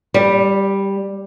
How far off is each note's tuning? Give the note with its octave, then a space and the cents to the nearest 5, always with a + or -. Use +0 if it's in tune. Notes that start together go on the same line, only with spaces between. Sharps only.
G3 +5